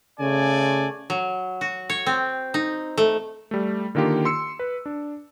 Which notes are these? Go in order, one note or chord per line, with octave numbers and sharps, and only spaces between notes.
C#3 A3 D5 G#5
F#3
F#4
C#5
C4
D#4
A3
G3 A3
D3 D#3 A#3 F4 G4
C6 E6 C#7
B4
D4